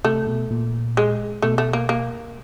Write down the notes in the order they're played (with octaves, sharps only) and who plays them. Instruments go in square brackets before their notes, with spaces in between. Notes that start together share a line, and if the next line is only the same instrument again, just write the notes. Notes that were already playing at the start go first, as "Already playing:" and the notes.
[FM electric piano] C3 [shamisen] A3
[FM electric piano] B2
A#2
[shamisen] G#3
[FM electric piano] B2 [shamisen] A3
[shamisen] A3
A#3
A#3